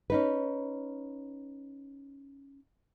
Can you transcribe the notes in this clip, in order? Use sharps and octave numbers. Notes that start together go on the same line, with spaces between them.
C#4 D#4 B4